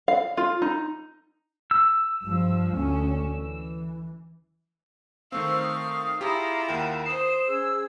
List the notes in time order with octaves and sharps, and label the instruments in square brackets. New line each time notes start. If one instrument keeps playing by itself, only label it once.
[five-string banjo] F5
F4
D#4
[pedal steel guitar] E6
[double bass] G2 F3
D2 C#4
E3
[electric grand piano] D#3 A3 C4 [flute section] C5 C#6 [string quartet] F5 [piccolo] E6
[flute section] C#6 [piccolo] D#6
[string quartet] E4 F4 [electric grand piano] G4 G#4 A#6 [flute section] A#5
[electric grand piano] D#2 A#4 G5 [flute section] F#5 [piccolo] E7
[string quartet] C5 [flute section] D#6 [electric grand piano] C7
[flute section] C#4 G#4 E6